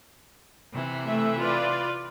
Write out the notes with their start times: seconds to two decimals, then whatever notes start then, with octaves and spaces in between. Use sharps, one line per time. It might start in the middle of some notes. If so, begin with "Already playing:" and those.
0.72 C3 E3
1.04 A3 E5
1.38 F4 B4 D5